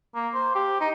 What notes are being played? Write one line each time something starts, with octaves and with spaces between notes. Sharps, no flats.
A#3
C5
G4
D#4